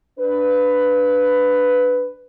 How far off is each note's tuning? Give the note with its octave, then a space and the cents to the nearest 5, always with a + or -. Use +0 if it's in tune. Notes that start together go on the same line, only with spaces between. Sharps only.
D4 +0 B4 +10